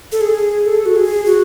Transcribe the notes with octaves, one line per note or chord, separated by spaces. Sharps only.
A4
G#4
A4
F#4
G#4
F#4